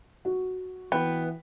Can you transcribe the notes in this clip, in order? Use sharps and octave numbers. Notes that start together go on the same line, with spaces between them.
F#4
E3 B3 B4 G5 B5